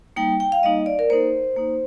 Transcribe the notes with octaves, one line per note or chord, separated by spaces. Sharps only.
G3 A#3 D#4 G5
G5
F5
G3 A#3 D#4 D#5
D5
A#4
A#3 D#4 C5
A#3 D#4